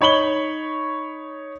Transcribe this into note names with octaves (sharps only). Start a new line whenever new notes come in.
D#4 C#5 B5 F#7 G7